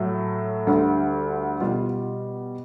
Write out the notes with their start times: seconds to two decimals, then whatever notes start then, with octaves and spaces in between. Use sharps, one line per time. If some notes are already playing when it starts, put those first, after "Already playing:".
Already playing: A2 F#3 A3
0.67 D2 D3 G3
1.61 B2 G3 F4